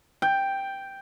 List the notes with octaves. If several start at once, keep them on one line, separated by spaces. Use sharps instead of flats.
G5